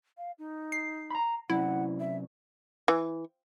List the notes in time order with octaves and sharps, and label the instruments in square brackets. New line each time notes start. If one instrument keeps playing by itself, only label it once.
[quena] F5
D#4
[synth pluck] C7
[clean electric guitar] A#5 B5
[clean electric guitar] C3 F#3 C#4 [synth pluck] E4 [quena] F#5
[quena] E5
[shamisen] E3